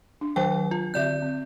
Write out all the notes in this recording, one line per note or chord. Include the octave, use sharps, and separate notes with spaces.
D4
D#3 F#3 C5 G5
F4
D3 C4 D5 E5 G6
C4